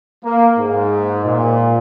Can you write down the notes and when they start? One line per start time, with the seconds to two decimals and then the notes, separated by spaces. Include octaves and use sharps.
0.24 A#3
0.58 G#2
1.26 A#2